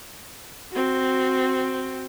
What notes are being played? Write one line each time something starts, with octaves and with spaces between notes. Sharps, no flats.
C4 F#4